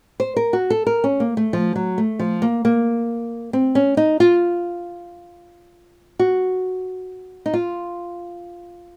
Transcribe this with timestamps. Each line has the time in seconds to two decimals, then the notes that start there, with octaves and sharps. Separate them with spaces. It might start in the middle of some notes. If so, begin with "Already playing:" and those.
0.20 C5
0.37 A#4
0.53 F#4
0.70 A4
0.87 A#4
1.04 C#4
1.20 A#3
1.37 A3
1.53 F3
1.76 F#3
1.98 A3
2.19 F3
2.42 A#3
2.65 A#3
3.53 C4
3.75 C#4
3.97 D#4
4.20 F4
6.19 F#4
7.46 D#4
7.54 F4